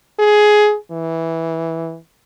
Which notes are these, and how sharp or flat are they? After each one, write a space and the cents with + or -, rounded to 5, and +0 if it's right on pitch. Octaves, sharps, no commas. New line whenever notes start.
G#4 +15
E3 -10